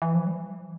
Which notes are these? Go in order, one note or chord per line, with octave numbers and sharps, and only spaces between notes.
E3
F3
G3